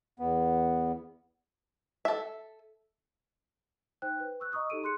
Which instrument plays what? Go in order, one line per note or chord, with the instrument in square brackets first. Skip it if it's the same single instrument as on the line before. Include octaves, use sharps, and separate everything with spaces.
[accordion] E2 B3
[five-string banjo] A4 E5
[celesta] D#4 C5 G5 F#6
B4
C#6 E6 F#6
D#5 A#5 C#6 D#6 E6
D#4 G4 A4 D7 D#7
G#4 C6 F#6 C#7